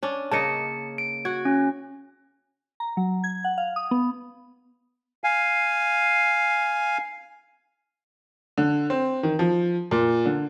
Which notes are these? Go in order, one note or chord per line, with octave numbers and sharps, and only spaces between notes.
C#4 D4
C#3 A#3 D#5 A5 C#7
D7
F#4 G#6
C#4
A#5
F#3
G#6
F#5
F5
D#6
B3
F5 G#5
D3
C4
D#3
F3
A#2
D3